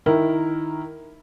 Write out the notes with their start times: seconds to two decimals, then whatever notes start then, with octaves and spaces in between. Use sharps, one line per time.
0.06 D#3 E4 A#4